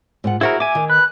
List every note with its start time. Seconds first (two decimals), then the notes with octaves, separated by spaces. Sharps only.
0.24 G#2 F4 F#5
0.41 E4 F#4 G#4 A#4 C5 E5
0.60 E5 G#5 D6
0.75 D#3
0.90 B4 F#6